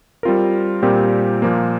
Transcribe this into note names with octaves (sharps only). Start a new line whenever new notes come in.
G3 C4 F4 A#4
A#2 G3 C4 G4 A#4
A#2 F3 A#3